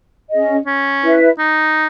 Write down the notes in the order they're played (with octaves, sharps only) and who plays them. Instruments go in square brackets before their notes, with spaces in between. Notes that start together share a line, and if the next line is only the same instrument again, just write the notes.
[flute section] C#4 G#4 D#5
[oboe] C#4
[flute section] E4 B4 E5
[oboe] D#4